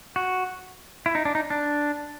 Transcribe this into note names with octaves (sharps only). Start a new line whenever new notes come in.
F#4
E4
D#4
D4
D#4
D4